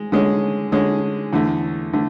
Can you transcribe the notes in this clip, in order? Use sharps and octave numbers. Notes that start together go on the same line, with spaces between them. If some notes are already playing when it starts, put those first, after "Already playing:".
Already playing: G#3
D3 G#3 C#4
D3 G#3 C#4
E2 D3 A3
D3 A3